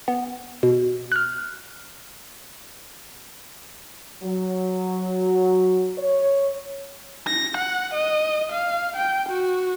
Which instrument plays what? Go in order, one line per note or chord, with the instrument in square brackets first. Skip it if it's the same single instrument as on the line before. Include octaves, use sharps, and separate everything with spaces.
[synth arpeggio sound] B3
B2
F6 F#6
[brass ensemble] F#3
C#5
[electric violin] A#6
F#5
D#5
F5
G5
F#4